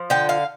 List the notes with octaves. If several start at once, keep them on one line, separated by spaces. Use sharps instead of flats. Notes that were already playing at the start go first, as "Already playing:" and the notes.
Already playing: F3
D3 G5
F5